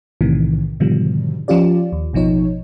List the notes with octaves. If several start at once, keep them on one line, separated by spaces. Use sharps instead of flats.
B1 A2 C3 D#3 E3
G#2 B2 D3 D#3 F3 G3
F3 C#4 F4 G4 D5
D#2
A1 B2 F3 D#4 C#5